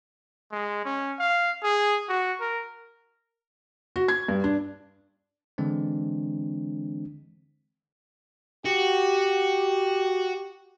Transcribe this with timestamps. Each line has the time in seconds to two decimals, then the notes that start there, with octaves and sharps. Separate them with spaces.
0.51 G#3
0.85 C#4
1.19 F5
1.63 G#4
2.09 F#4
2.40 A#4
3.96 F#4
4.08 G#6
4.28 G2
4.44 D4
5.58 D3 E3 G#3 C4 D4
8.65 F#4 G4